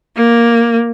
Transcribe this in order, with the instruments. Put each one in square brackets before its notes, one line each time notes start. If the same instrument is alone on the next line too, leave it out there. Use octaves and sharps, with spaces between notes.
[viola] A#3